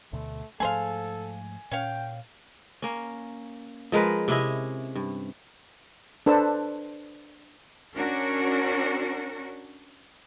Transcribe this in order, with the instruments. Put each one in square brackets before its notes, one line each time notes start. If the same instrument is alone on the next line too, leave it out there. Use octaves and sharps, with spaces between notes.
[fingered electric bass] D2 B2 D3 [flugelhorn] A3
[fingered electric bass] G#2 F3 A3 [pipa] G#4 C5 F5 [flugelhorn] A4 [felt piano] G#5
[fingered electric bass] A#2 [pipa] C#4 C#5 F5 [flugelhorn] G5
[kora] A#3 C#4
F3 G#3 A#4 B4
C3 C#4 E4 D#5
G2
[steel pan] D4 A4 B4 C5 A5 E6
[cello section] C#4 D4 F#4 A#4